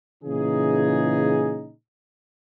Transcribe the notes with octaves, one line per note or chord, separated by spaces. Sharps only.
A#2 C#3 E3 D#4 G#4